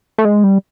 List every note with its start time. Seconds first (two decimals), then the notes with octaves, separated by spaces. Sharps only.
0.18 A3
0.25 G#3
0.44 G3